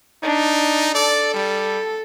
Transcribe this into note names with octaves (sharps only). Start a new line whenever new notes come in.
D4 D#4
A4 D5
G3